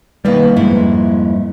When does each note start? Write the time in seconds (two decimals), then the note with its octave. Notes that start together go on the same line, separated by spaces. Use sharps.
0.25 B2 D#3 G3 A#3 B4
0.56 F2 G#2 E4